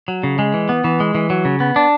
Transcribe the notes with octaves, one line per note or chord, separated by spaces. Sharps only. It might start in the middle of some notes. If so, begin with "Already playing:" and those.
F#3
C#3
G#3
E3
B3
E3
G#3
E3
F#3
C#3
B3
D4